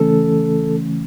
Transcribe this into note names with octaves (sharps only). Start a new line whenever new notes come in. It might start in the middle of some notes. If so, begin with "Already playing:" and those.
Already playing: C#3 E3 A3 C#4 A4